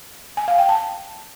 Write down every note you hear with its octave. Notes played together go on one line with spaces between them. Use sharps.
G#5
F5
G5
A5